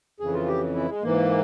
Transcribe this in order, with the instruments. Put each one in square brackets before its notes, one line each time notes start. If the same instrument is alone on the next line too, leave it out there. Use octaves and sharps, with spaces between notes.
[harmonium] F2 C#3 E3 G#4
F4
G4
E4
G#3
G#2 E3 A#3